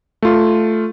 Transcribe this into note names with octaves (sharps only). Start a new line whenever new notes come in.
A3 F4